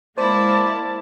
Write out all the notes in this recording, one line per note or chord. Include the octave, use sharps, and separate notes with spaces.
G#3 A#3 E4 C5 D5 A5